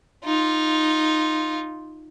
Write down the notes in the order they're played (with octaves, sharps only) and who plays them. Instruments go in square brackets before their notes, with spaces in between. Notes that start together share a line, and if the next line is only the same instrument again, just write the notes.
[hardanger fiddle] D#4 F4